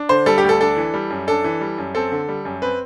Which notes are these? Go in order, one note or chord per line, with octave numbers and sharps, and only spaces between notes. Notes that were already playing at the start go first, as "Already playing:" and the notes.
Already playing: D4
D3 C5
G3 A4
G4
D2
A4
D4 A4
E3
G3
F#2
D4 A4
E3
G3
F#2
C4 A4
D3
G3
F#2
C4 B4